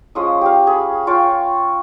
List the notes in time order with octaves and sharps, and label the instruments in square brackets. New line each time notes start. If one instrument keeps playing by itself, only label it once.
[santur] F3 G#3 C#4 D#6
G4 F5
G#4 B5
F4 C#5 F5 G5